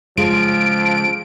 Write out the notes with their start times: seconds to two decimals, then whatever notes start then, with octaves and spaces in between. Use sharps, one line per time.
0.17 C#3 F3 G#3 F4 D7